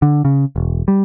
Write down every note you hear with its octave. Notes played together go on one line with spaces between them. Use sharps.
D3
C#3
E1
G3